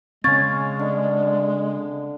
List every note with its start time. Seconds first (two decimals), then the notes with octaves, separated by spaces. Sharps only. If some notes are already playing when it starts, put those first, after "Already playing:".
0.24 C#3 G#3 C4 C#4 F5 C#6 G#6 A6
0.79 D3